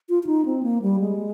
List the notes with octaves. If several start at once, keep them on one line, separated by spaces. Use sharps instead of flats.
F4
F4
D#4
C4
A#3
G3
G#3